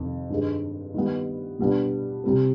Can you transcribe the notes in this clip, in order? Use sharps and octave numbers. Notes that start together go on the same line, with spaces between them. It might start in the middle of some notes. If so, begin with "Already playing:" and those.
Already playing: F2 C3 D#3
G2 D#3 G#3
D#3 G3 B3
B2 G3 B3 D4
C3 G3 C4